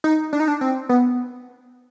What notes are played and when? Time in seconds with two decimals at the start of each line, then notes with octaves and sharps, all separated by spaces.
0.04 D#4
0.33 D4
0.40 D#4
0.48 D4
0.61 C4
0.89 B3